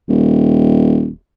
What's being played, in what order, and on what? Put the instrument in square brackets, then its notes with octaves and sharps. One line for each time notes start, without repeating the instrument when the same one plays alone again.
[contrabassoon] D#1